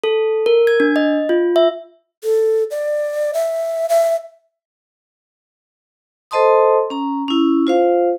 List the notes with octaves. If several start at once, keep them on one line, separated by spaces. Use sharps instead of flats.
A4
A#4
G#6
D4
D#5
F4
E5
A4
D5
E5
E5
A4 C5 D#5 A5 C6 D#6
C#4 A#5
C#4 E4
F4 C5 F5